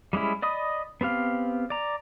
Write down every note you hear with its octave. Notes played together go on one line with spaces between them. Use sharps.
G3 G#3 C#4 E4
D5 D#5 B5 D#6
B3 C4 G4 F5
D5 A#5